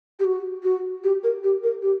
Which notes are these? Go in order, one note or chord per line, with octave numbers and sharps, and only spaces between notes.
G4
F#4
F#4
G4
A#4
G4
A#4
G4